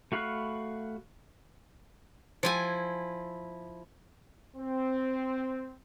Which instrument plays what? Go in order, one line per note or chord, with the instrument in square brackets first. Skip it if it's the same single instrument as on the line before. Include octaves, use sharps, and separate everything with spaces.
[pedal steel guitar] A3 F#4 F5 B5 F#6
[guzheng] F3 E4 G#5
[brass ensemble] C4